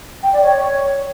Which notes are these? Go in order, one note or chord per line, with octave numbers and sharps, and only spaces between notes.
G5
D5
C#5